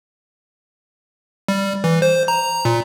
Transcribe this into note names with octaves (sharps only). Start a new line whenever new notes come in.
G3
E3
C5
A#5
A#2